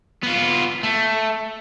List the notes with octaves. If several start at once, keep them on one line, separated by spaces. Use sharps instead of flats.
B3 F4
A3